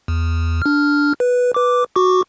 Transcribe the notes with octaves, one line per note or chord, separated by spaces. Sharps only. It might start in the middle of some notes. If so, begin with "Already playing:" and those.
E2
D4 F6
B4
B4 D6
F#4 C#6 D6